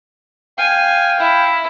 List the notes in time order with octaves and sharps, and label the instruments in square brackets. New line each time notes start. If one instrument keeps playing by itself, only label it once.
[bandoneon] F5 G5 [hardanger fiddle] G#5
[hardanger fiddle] E4